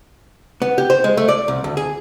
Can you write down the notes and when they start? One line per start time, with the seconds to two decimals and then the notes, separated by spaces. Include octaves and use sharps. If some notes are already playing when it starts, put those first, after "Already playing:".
0.62 B3
0.78 G4
0.90 C5
1.04 G#3
1.17 A3
1.29 D5
1.48 C2
1.64 D2
1.77 G#4